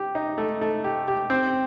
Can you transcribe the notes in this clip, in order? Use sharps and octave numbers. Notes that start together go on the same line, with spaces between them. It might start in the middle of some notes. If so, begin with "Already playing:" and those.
Already playing: G4
D#4
A3
A3
G4
G4
C4